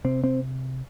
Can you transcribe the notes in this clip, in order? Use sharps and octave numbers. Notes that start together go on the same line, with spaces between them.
C3 C4
C4